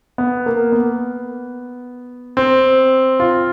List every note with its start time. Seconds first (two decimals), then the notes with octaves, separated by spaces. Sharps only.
0.18 B3
0.46 A#3
0.72 B3
2.37 C4
3.20 F4